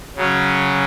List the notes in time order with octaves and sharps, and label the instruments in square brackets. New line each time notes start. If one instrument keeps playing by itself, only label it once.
[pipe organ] C#3 F#3 C#4